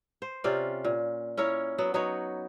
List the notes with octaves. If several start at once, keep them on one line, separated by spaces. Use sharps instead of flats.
C5
C3 C#4 F4 D5
A#2
C#4 E4 A#4 C#5
F#3 B3
F#3 D#4 B4 C#5